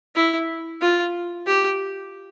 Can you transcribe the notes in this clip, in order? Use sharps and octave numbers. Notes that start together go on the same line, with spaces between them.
E4
F4
G4